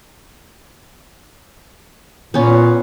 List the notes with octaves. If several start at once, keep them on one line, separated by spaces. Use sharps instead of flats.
A#2 B3 C#4